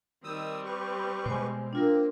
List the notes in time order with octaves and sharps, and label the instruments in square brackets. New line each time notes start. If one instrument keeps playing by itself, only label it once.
[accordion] D#3 D#6 E6 [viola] G3 C4
[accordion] G4 B4 C#6
[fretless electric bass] B2 G#3 [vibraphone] C5 G#5
[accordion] A#3 C4 [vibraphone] D4 F4 A#4